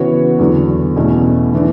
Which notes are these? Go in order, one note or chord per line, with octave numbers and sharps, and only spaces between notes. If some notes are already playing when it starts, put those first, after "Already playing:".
Already playing: C#3 E3 B3 F#4 C#5
E2 D3 F#3
E2 B2 A3 C#4
E3 B3 D4